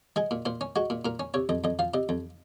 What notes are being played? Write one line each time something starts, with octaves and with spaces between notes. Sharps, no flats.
G#3 G#4
A#2
A#2 C5
C#4
G#3 F#4
A#2
A#2 A#4
C#4
C3 C#5
F2 D#5
F2 D#5
F3 F5
C3 D#5
F2